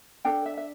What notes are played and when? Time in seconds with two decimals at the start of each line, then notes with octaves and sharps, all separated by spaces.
0.25 D4 A4 G5
0.46 E5
0.57 E5